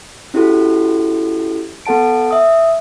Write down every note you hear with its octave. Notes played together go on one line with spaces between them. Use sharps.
C#4 E4 F#4 G4 A4
B3 A4 F#5 A5 D7
E5 D#6